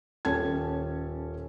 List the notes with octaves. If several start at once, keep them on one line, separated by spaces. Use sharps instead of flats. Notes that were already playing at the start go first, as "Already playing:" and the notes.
D#1 C#4 A4 A5 G#6